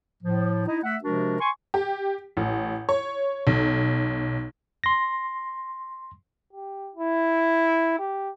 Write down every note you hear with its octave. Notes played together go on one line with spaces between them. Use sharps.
A2 F3
D#4 E4 D#5
A3 E5 F#5
C3 F3 G#3 D4 F#4 A#4
G#5 C6 C#6
G4
A1
C#5
B1
C6 A#6
G4
E4
G4